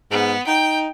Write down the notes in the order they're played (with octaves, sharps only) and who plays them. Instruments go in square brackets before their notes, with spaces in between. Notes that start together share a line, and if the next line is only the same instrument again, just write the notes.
[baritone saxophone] G#2 [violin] B3
[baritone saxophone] D#4 [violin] G5